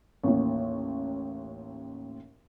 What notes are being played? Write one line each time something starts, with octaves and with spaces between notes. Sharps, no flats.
A1 D#2